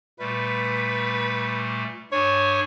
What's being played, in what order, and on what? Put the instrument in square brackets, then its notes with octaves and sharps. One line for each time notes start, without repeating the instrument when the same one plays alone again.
[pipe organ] A#2 G3 A3 [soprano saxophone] B4
[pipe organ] G2 D4 G#5 [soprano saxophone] C#5